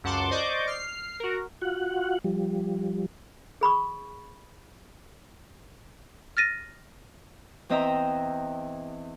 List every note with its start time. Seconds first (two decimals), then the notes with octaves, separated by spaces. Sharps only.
0.04 C#2 F#2 F#5 A5 C6 D6
0.31 C5 D5 D#5 C#6 D6 G6
0.67 F6 C7
1.20 F#4 A#4
1.62 F4 F#4 F#5
2.24 F3 G3
3.61 G#4 B5 C#6 D#6
6.37 F6 A6 A#6 D#7
7.69 E2 C4 D#5 E5 G5 A#5